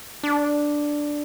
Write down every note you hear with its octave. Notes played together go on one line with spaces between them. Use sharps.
D4